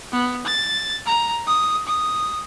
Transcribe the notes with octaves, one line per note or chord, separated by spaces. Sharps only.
B3
A6
A#5
D#6
D#6